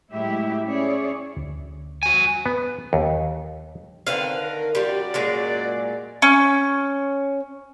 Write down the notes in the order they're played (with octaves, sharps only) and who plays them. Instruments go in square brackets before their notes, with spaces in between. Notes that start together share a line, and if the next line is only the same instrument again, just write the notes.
[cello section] A2 F#3 G#3 E4 G4 E5
C#4 E4 G#4 C#5 D5
[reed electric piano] D2
[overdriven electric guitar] F#4 G#5
[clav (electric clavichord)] B3
D#2
[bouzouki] D3 B4 F5 [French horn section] D#3 B3 C4
[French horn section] D#3 A#4
[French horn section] F#2 F#4 D5 [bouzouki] G3 F4
[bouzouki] A#2 F#3 G#3
[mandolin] C#4